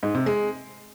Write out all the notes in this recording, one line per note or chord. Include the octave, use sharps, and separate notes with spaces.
G#2
C3
G#3